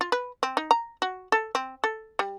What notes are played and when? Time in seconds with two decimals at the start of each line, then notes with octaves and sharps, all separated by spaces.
0.01 F4
0.12 B4
0.43 C4
0.57 D#4
0.71 A#5
1.02 F#4
1.32 A4
1.55 C4
1.84 A4
2.19 G3